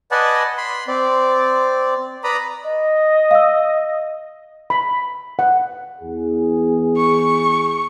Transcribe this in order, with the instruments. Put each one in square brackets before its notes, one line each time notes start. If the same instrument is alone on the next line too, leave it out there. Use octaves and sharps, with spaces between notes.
[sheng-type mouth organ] B4 D5 D#5 F#5 G#5 A5
B5 C6
C4 D5
B4 D5 A#5 B5 D#6
[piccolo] D#5
[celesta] F5 E6
[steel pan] B5
F#5
[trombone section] E2 G#4
[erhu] C#6